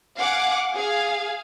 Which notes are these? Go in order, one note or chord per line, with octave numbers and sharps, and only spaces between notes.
F5 F#5 G#5 D6
G#4 F5